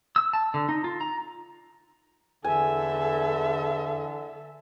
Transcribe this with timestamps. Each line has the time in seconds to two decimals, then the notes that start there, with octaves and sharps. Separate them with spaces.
0.16 E6
0.33 A5
0.54 D3
0.69 D#4
0.84 F4
1.01 A#5
2.44 E2 D3 A4 E5 G#5